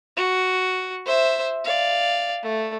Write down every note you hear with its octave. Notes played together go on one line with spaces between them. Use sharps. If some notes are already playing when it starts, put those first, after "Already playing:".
F#4
C5 E5
D5 F5
A3